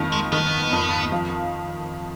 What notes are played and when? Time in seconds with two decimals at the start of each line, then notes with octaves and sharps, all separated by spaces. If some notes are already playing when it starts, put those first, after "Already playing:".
Already playing: F2 D#3
0.12 G#3
0.32 D#3 B3
0.73 F2
1.12 F3